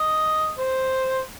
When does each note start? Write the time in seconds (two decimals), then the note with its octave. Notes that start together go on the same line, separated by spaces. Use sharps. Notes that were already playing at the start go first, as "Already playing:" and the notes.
Already playing: D#5
0.59 C5